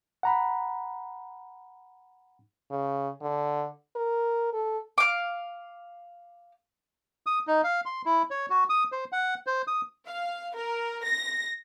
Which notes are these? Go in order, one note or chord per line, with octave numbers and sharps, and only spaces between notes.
F#5 A#5 B5
C#3
D3
A#4
A4
F5 D6
D#6
D#4
F5
C6
E4
C#5
F#4
D#6
C5
F#5
C5
D#6
F5
A#4
A#6